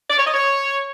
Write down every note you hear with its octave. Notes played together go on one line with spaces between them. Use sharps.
D5
C#5
D#5
C#5